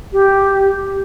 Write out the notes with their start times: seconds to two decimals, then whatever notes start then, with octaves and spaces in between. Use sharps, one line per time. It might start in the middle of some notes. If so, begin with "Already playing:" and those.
0.13 G4